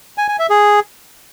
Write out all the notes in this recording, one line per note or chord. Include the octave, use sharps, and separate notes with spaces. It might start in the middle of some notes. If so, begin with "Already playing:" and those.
G#5
G#5
E5
G#4